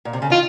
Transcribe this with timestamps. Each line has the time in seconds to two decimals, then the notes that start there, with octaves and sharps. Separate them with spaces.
0.05 A#2
0.13 C3
0.22 C#3
0.30 D#3 F4